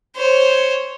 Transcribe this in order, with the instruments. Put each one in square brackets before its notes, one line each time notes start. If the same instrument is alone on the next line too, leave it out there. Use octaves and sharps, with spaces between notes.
[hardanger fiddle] C5 C#5